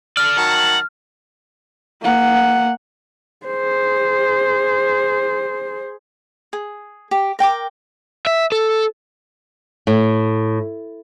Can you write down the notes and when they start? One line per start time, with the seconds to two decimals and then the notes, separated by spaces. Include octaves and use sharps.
0.17 A4 D5 F6
0.37 D#3 F#3 F#5 A5
2.02 A#3 F#5
3.47 G#4 C5
6.53 G#4
7.11 G4
7.39 A#4 G5 A5 D6
8.27 E5
8.52 A4
9.87 A2